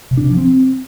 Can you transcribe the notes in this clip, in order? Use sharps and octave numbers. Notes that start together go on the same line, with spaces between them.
C3
D4
C3
F3
C4